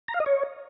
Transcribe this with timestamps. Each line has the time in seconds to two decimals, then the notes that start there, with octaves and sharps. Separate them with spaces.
0.08 A#5
0.14 F5
0.20 D#5
0.26 C#5